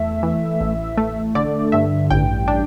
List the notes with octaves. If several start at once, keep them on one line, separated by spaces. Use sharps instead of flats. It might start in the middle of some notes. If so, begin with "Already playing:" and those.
Already playing: E2 A3 E5
E3
A1
A3
D3 D5
G2 E5
A1 G5
D4